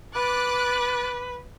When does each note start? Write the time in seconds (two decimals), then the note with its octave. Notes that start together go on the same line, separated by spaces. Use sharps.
0.15 B4 D6 F#6 A6